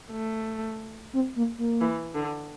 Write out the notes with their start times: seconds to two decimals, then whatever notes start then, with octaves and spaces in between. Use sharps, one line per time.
0.12 A3
1.13 C4
1.36 A#3
1.58 A#3
1.81 E3
2.15 D3